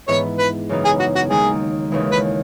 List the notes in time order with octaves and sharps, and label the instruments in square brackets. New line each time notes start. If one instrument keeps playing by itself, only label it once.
[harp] G#2 E3 B3 [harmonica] C#5
[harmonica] B4
[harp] F#2 C#3 E3 B3 D#4
[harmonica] G#4
F#4
F#4
[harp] D#2 D#3 G#3 D#4 [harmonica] G#4
[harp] D#2 C#3 E3 G#3
[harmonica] B4